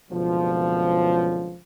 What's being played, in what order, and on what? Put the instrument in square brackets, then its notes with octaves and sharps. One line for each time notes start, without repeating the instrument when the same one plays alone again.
[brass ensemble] F#1 C#2 B2 D3 F3